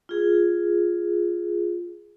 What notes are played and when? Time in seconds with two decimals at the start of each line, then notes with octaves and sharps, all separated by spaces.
0.09 F4 G#4